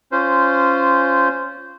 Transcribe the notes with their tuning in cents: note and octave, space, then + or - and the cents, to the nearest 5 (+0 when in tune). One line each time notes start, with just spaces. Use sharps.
C#4 +5 F4 -10 C5 -15